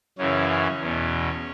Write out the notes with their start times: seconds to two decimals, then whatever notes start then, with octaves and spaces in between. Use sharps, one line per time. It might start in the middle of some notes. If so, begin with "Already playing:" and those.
0.18 F#2 C#3 E3 C#4
0.80 E2 B2